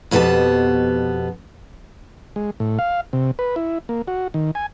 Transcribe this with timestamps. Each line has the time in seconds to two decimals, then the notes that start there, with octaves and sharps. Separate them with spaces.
0.11 F2 B2 B3 F#4 G4 A5
2.36 G#3
2.60 A2
2.79 F5
3.13 C3
3.39 B4
3.56 E4
3.89 A#3
4.08 F#4
4.34 D#3
4.55 G#5